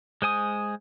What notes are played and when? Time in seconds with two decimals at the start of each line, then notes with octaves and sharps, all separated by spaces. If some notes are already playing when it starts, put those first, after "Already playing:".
0.22 G#3 C5 G#5 D#6